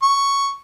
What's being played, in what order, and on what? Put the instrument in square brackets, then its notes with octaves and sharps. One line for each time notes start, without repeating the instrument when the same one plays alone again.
[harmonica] C#6